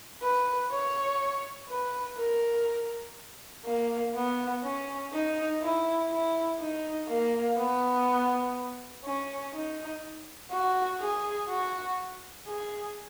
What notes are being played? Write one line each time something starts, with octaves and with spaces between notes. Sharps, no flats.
B4
C#5
B4
A#4
A#3
B3
C#4
D#4
E4
E4
D#4
A#3
B3
C#4
D#4
F#4
G#4
F#4
G#4